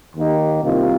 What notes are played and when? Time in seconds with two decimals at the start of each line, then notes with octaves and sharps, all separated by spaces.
0.15 D#2 D#3 A#3 D#4 G4
0.62 C2 C3 D#3 A#3 F4